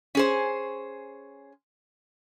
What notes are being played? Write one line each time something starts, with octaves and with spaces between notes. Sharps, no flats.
C#4 G#4 C5